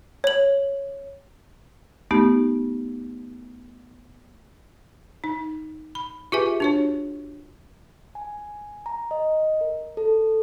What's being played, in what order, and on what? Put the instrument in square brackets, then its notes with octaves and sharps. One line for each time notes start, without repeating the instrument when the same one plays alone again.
[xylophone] C#5 F#7
[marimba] A3 B3 D#4 G4
[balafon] D#4
B5
F4 G4 G#4 B4 E5 G#5
D4 F#4 C#5
[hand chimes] G#5
A#5
D#5
A#4
A4